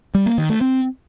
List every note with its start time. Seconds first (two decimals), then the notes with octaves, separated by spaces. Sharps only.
0.15 G3
0.26 A#3
0.38 D#3
0.49 A3
0.61 C4